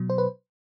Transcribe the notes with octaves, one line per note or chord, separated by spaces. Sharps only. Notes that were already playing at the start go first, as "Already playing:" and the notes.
Already playing: B2 F#3
C5
B4